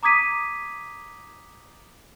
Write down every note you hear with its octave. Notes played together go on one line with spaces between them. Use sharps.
A#5 D6 D#6 G#6 B6 D#7